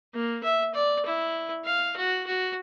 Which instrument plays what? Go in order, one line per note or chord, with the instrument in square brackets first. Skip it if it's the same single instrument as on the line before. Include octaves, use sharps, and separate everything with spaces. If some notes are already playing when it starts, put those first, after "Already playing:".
[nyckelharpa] A#3
E5
D5
E4
F5
F#4
F#4